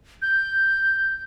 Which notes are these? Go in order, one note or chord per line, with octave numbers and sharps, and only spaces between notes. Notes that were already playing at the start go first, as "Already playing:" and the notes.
G6